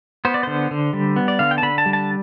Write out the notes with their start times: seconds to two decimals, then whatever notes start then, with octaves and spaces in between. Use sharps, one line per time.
0.25 B3 C5
0.34 D5
0.43 D3 C5
0.71 D3
0.93 G3
1.16 B3
1.28 D5
1.39 D3 F5
1.51 G5
1.58 A5
1.63 D3 B5
1.78 A5
1.86 G3
1.93 A5